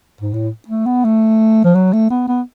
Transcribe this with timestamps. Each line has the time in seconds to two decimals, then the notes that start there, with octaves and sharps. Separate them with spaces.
0.21 G#2
0.33 A2
0.68 A3
0.86 B3
1.05 A3
1.64 F3
1.75 F#3
1.93 A3
2.11 B3
2.28 B3